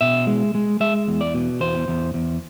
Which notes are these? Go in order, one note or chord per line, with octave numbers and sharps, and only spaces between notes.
B2 E5
G#3
G#3
G#3 E5
E2
D5
B2
E2 C5
E2
E2